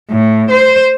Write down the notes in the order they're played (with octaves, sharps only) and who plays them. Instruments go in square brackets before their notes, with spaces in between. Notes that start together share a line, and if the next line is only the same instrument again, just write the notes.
[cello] A2
C5